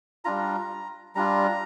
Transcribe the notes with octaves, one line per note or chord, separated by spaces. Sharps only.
G3 D4 F4 A#5
G3 D4 F4 A#5